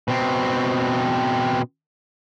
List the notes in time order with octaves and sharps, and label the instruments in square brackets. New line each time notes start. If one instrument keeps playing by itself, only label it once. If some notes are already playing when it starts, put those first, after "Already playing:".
[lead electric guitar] B2 C4